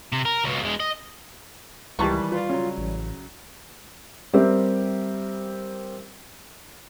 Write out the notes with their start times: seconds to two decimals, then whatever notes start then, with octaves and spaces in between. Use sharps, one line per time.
0.12 C3
0.25 A#4
0.44 C#2 B2
0.63 E2 G#3
0.80 D#5
1.99 C#2 D#3 E3 G3 G4 B4 A5 C#6
2.32 F4 B4 D5
2.49 C#3 F#3 C#4
2.78 A1
4.33 G3 C4 G4 A#4 E5